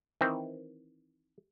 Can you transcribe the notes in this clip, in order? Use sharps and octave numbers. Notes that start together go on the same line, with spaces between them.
D#3 E3 C4